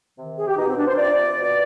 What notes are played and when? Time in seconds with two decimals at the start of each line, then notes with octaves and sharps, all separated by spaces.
0.16 C3 D#3
0.36 G#4
0.47 G4
0.57 B2 D#4
0.67 C4
0.77 D4
0.87 C5
0.97 C3 F3 D5
1.38 B2